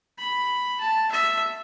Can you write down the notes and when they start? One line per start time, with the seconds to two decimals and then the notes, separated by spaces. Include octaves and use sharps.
0.18 B5
0.80 A5
1.11 E5